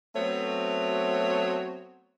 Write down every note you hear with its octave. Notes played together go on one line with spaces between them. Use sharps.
F#3 A3 B3 C4 F#4 C#5